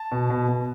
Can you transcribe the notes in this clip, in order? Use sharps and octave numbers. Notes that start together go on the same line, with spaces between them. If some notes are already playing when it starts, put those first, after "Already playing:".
Already playing: A5
B2
B2
B2